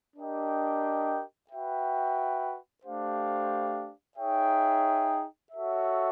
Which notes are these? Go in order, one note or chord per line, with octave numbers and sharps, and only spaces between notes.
D4 G4 A#4 D#5 G5
F#4 B4 E5 G5
A3 D4 G4 C5 F5
D#4 G#4 C#5 E5 G5
F#4 A4 C#5 E5